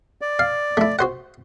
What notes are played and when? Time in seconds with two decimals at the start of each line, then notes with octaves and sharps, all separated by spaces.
0.21 D5
0.39 F5
0.77 A3 E4
0.99 F#4 C5 F#5